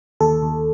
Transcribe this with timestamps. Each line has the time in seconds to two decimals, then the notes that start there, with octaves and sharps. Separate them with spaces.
0.20 D#2 A4
0.42 D#2